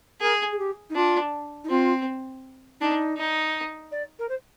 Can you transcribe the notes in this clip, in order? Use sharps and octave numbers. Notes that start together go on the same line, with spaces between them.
G#4 A#4
G#4
G4
D#4
D4 F4
D#4
C4 F4
D4 D#4
D#4
D5
A#4
C5